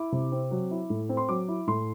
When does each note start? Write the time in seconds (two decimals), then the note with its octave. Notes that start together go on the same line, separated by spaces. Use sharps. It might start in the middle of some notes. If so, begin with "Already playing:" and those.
Already playing: E4 D6
0.12 C3
0.32 C4
0.51 F#3
0.71 E4
0.90 A2
1.09 C4
1.17 C6
1.29 F#3 D6
1.48 E4
1.67 A2 C6